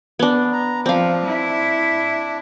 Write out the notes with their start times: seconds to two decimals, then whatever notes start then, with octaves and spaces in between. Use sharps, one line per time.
0.19 B3 D4
0.53 A#5
0.86 F3 C4 D4 F5
1.25 E4